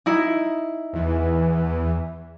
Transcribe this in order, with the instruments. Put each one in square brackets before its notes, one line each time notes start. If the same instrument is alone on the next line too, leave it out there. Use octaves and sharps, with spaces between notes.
[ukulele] D#4 E4
[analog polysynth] E2 E3